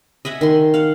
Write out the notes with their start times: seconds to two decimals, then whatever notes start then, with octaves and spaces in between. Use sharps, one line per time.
0.25 D#5 E5 F#5 G#5
0.41 D#3 C6
0.74 F5 F#5